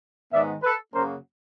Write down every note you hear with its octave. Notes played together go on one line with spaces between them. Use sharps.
G#2 D#3 G#3 B3 D5 E5
A4 B4
F#2 C#3 F#3 A#3 C#4 A#4 C5